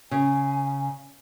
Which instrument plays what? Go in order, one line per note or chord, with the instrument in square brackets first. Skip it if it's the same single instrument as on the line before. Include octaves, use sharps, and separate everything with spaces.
[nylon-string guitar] C#3 [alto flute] G#5